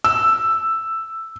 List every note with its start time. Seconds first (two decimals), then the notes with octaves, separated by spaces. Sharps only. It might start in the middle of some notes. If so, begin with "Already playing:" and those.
0.04 E6